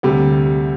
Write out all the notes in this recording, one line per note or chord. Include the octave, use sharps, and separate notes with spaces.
D2 C3 G3